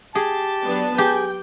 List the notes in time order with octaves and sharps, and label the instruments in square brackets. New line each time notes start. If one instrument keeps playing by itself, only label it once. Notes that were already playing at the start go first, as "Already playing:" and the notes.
[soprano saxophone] G4 [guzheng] G#4 [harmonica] A5
[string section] F#3 B3 D4
[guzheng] G4 [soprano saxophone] G#4 [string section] G5